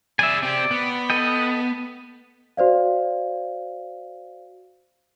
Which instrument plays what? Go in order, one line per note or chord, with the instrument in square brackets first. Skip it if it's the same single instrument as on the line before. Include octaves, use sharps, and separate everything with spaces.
[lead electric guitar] G#4 D5 [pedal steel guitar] E5 G#5
[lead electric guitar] C4 G4 [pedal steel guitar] D5
[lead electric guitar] B3
[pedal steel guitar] A4 D#5 G5
[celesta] F#4 C5 D5 F5